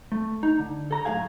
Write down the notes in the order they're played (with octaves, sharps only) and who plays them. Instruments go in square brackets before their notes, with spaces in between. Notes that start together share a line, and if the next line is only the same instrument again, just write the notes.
[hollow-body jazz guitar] A3
D#4
D3
A4 A#5
F#2 A2 G#4 F5 G#5